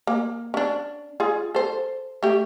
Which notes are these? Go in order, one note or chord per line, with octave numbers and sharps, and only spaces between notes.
A#3
C#4 D4
F4 G#4
A4 C5
A3 G4